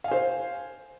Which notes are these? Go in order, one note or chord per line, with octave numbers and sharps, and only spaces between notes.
C5 F5 G#5